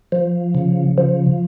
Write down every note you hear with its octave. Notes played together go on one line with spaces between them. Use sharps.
F3
C#3
F3